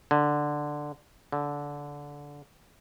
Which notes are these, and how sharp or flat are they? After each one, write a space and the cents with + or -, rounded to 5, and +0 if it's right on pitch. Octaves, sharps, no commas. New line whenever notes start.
D3 +5
D3 -20